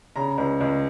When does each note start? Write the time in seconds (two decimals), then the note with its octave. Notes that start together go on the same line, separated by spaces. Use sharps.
0.16 C#3 A#5
0.38 C#2
0.60 C#2